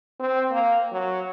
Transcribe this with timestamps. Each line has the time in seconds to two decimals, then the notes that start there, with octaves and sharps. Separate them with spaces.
0.20 C4
0.51 A#3
0.92 F#3